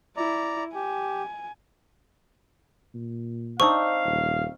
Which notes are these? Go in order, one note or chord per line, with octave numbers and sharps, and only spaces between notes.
E4 D5 A#5
G4 G#5
A#2
C4 D4 D#4 F5 C#6
D#1